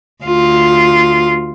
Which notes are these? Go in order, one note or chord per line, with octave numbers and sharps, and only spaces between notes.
D2 F4